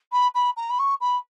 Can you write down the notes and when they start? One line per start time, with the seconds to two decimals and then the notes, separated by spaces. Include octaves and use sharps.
0.12 B5
0.34 B5
0.56 A#5
0.70 B5
0.79 C#6
1.00 B5